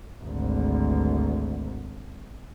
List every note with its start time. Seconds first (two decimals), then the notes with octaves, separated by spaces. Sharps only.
0.23 G#1 D2